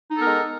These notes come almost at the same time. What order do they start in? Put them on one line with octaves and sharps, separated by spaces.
D#4 A4 B3 A#4 G#3